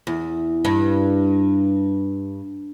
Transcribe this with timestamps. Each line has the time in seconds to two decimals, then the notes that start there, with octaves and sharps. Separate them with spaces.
0.07 E2
0.65 G2